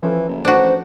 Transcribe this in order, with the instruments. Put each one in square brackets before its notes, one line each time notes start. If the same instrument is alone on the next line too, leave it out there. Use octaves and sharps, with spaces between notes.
[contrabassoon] E3 [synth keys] F3 C#4 A4
[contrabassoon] F#1
[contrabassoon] A1 [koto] D4 F#4 [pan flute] C5